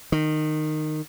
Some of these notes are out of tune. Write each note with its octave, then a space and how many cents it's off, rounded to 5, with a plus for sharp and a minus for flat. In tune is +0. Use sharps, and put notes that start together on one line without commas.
D#3 -15